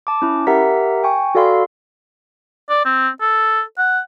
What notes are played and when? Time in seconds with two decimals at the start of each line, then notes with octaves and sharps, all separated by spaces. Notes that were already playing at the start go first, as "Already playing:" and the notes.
0.07 A5 D6
0.22 C#4 E4
0.47 G4 A#4 E5 F#5 A#5 B6
1.03 G5 G#5 C#6
1.35 F#4 A4 D5 F5 B5 C6
2.70 D5
2.85 C4
3.21 A4
3.78 F#5